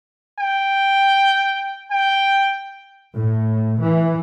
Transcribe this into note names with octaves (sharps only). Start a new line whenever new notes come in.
G5
G5
A2
E3